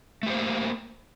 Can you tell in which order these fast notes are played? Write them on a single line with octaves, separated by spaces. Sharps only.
A3 G4 C5 A#3